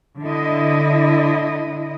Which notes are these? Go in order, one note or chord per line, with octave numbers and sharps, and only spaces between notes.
D3 E4 D#5